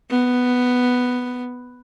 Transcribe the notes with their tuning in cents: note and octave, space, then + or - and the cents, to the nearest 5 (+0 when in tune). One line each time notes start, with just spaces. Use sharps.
B3 +5